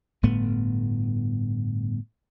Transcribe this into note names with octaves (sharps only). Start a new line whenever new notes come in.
G1 A2 A3 B3